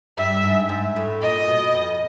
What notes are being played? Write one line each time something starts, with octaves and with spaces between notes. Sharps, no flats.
G2 E5
G#2
G#2
A2
A#2 D#5
B2
F2